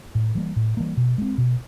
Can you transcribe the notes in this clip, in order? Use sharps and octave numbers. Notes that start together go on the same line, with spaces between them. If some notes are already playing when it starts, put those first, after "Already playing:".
A2
E3 G3 A#3
A2
E3 G3 A#3
B2
G#3 C4
B2